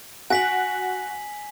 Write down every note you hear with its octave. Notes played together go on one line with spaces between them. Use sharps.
F#4 G#5 B6 F#7